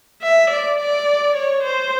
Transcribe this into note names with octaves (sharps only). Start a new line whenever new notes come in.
E5
D5
D5
C#5
C5